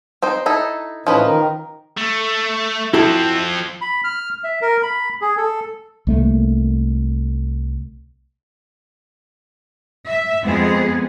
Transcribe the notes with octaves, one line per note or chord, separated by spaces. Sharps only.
C4 D#4 C5
D#4 E4 A4
A2 E3 F3 C#4 D#4 B4
D#3 A#4
A3
F3 C4 E4 F#4 A4
B5
F6
E5
A#4
B5
G#4
A4
C2 A3 A#3
E5
F2 G#3 B3 C4 G#4